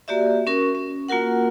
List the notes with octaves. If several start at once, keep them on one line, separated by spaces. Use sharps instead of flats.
A#3 F#4 G4 D5 E5
C#4 F#4 A#4 C#6
C#4
A#3 F4 F#4 A#4 F#5